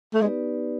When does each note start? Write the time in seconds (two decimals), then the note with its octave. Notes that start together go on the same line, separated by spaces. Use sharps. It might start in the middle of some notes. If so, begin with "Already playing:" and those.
0.14 A3
0.22 G#3 B3 D#4 G4 B4 D5